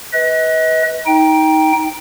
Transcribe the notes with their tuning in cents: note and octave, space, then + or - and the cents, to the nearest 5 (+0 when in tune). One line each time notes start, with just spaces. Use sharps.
B4 +0 D#5 +40
D#4 +20 G5 +0